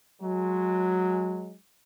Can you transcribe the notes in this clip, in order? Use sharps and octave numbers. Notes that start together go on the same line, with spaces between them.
F#3 G#3